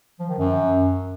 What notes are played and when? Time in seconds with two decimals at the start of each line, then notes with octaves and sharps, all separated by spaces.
0.19 F3
0.29 D#3
0.39 F#2